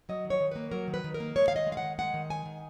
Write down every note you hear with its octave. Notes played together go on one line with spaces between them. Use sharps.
F#3 D#5
D#3
C#5
D#3
A#3 B4
F#3 A#4
D#3
B4
D#3
A#4
A#3
G#3 C#5
F5
D#3 D#5
G#3
F5
F#5
D#3
G#3 F#5
D#3
G#3 G#5
D#3